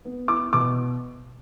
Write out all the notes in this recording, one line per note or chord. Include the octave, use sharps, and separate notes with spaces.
B3
E4 D6
B2 D6